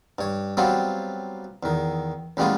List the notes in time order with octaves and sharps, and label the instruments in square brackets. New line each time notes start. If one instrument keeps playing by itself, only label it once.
[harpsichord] G2 C#5
F#3 G3 B3 C4 F4
E2 D#3
A1 G3 G#3 B3 F4